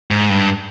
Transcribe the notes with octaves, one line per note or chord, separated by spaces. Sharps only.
G#2
G2